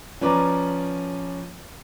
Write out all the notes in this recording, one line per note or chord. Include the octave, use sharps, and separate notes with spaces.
F3 C#4 B4 D5 A#5 D6